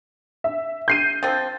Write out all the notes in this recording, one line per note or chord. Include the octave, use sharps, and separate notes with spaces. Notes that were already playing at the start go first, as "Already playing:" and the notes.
E5
G6 C7 D#7
F3 C4 A6